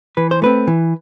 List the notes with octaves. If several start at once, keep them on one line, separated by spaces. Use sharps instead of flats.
E3 B4
C5
A3 C4 B4
E3